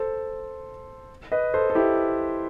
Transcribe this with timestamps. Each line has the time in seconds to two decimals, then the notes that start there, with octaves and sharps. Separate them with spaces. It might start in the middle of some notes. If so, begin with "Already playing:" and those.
Already playing: A4 C5
1.32 B4 D#5
1.54 A4 C5
1.70 A4
1.75 E4 G4